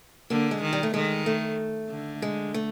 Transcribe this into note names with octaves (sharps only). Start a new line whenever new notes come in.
D3 A#3
G#3
D#3
G3
A3
D#3 G#3
A3
D3
G#3
A3